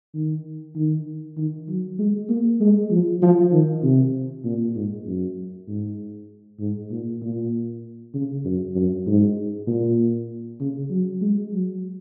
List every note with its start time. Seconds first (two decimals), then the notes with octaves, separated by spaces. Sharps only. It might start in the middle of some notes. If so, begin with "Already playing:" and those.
0.14 D#3
0.76 D#3
1.37 D#3
1.68 F#3
1.99 G#3
2.30 A#3
2.60 G#3
2.91 F3
3.22 F3
3.53 D#3
3.83 C3
4.45 A#2
4.76 G#2
5.06 F#2
5.68 G#2
6.60 G#2
6.91 A#2
7.22 A#2
8.14 C#3
8.45 F#2
8.75 F#2
9.06 G#2
9.67 A#2
10.60 C#3
10.91 F#3
11.22 G#3
11.52 F#3